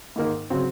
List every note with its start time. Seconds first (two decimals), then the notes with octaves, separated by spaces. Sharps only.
0.16 G#2 D#3 A#3 D#4
0.50 C#3 F#3 C4